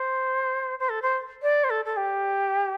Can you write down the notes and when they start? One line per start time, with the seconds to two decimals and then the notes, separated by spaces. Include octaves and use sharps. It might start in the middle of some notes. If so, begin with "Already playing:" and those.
Already playing: C5
0.79 C5
0.89 A4
1.02 C5
1.43 D5
1.64 C5
1.70 A4
1.85 A4
1.97 G4